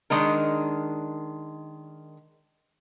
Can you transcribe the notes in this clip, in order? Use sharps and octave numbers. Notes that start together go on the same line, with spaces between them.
D#3 G#3 D4 A#4